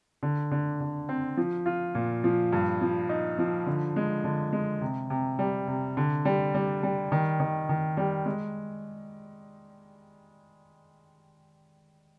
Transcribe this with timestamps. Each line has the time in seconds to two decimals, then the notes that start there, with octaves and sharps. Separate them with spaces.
0.23 D3
0.51 D3
0.80 D3
1.09 C4
1.37 F3
1.66 F4
1.95 A#2
2.24 F3
2.52 G2
2.81 F3
3.09 D#4
3.39 F3
3.66 D3
3.96 G#3
4.24 D3
4.53 G#3
4.81 C3
5.10 C3
5.39 G3
5.68 C3
5.97 D3
6.25 G3
6.54 G3
6.83 G3
7.12 D#3
7.40 D#3
7.69 D#3
7.97 G3
8.26 G#3